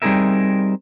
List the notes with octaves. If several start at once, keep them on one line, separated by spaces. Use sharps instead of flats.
G3 C4 D#4 G#4 A#4 E5